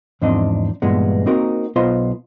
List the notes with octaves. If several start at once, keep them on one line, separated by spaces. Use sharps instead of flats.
E2 G#2 F3 C4 D4 D#5
G2 A#2 E3 G#3 B3
A#3 C4 D#4 F#4 A#4
B1 B3 F4 C5 D#5 C6